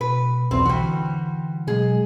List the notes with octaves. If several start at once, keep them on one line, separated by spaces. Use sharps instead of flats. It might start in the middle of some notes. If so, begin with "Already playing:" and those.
B2 B4
B1 E2 B2 C4
D3 E3 G3 F#4
B2 F#3 G#3 G#4